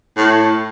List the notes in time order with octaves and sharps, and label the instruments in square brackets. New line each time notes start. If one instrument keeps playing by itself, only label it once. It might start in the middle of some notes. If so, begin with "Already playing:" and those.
[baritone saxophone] A2